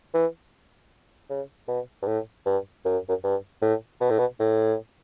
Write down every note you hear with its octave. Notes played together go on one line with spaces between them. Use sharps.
E3
C#3
B2
G2
A2
G2
F#2
F#2
G2
A2
B2
A2
B2
A2